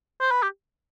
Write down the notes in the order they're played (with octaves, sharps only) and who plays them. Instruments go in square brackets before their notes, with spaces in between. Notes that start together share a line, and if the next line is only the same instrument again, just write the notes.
[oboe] C5
B4
G4